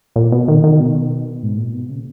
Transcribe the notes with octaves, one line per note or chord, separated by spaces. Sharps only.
A#2
B2
D#3
D#3
B2
G#2
A#2
B2
C#3